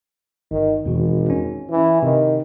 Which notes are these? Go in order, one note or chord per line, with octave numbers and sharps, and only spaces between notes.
G1 D#3
G#1 E2 B2 E3
C#4
E3
C3 D#3